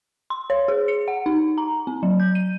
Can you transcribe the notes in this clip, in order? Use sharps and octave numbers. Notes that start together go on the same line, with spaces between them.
C6
C#5
G#4
C#7
F#5
D#4
A#5
C4
F#3
G6
D#7